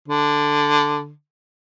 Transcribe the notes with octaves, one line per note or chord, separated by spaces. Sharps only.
D3